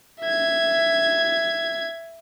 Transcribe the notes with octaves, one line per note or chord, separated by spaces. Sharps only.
E5 G#6